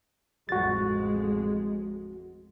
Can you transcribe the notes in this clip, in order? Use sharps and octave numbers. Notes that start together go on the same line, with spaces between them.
A1 F2 G#3 F#4 A6